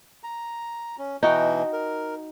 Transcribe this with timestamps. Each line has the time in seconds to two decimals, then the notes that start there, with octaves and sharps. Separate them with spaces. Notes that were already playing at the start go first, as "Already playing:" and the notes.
0.24 A#5
0.98 C#4
1.23 B2 E3 D#4 F#4 G5
1.73 A#4